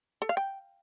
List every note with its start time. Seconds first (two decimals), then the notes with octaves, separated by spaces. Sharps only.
0.22 A4
0.29 F5
0.37 G5